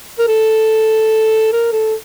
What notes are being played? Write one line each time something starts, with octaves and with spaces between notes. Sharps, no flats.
A#4
A4
A#4
A4